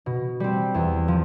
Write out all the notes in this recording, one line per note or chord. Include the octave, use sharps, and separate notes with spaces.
B2
G3 C4
E2
F3